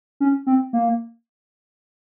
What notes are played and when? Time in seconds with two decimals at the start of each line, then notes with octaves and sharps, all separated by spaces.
0.20 C#4
0.47 C4
0.73 A#3